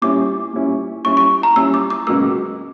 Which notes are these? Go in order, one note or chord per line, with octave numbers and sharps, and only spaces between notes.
A#2 G3 C#4 E4 D6
A#2 G3 C#4 E4
A#2 G3 C#4 E4 C#6
C#6
A#5
A#2 G3 C#4 E4 E6
D6
D6
C#2 B2 F#3 A#3 E6